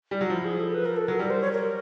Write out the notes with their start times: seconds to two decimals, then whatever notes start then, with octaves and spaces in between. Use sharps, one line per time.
0.11 G3
0.21 F#3
0.30 F3 E4
0.44 G#4
0.60 A4
0.74 B4
0.85 A#4
0.96 A4
1.07 F#3 A#4
1.19 G3 A#4
1.30 C5
1.41 C#5
1.53 A#4